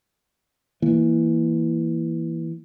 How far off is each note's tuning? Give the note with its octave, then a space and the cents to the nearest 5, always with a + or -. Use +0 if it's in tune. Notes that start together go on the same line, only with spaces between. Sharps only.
E3 +0 A#3 +0